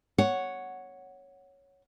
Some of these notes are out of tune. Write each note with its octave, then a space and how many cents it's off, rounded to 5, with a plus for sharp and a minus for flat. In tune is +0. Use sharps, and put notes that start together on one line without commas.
C#5 +0 F#5 +0